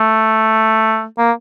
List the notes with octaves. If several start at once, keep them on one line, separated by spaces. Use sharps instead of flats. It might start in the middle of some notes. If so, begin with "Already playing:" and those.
Already playing: A3
A#3